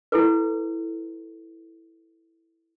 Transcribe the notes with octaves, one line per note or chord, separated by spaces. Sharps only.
E4 A4 B4